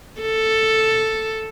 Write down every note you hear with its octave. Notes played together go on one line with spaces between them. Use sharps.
A4